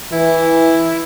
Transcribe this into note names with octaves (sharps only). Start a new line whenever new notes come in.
E3 E4